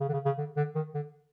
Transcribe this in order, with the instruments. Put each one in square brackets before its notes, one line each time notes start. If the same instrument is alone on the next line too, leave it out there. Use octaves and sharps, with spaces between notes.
[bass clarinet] C#3
D3
C#3
C#3
D3
D3
D#3
D3